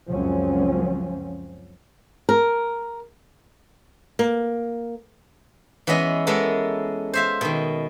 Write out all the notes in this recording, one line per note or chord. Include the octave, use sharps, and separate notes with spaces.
C#2 F#2 F3 F#3 C4 C#4
A#4
A#3
E3 G#3 B3 C#4 D#5
E3 G#3 B3 A4 A#4
C5 E5 F5
B2 D#3